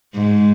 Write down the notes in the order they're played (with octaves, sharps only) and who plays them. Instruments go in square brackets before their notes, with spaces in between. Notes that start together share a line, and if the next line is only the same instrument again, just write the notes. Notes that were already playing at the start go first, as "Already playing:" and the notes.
[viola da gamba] G#2